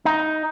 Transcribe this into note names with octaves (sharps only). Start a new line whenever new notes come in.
D#4